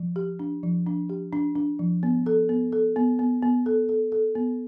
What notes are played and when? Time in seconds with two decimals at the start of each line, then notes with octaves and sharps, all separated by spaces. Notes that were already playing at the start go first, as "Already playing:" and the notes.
Already playing: F3
0.16 G4
0.39 D4
0.63 F3
0.86 D4
1.09 G4
1.33 D4
1.55 D4
1.79 F3
2.03 B3
2.26 A4
2.49 B3
2.72 A4
2.96 B3
3.19 B3
3.43 B3
3.66 A4
3.89 A4
4.12 A4
4.35 B3